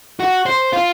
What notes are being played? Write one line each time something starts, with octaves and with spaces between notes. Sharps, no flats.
F#4
C5
F4